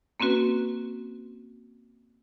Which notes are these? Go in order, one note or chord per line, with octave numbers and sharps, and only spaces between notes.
A#3 C4 C#4 F#4 B4